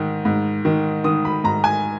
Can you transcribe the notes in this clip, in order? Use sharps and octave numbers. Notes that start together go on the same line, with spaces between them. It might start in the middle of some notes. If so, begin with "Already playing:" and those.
Already playing: G#2 D#3
G#2
D#3
D#3 D#6
B5
G#2 A#5
G#5